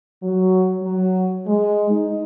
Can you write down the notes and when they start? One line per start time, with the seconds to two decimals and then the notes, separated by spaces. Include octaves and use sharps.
0.23 F#3
0.83 F#3
1.47 G#3
1.90 D#4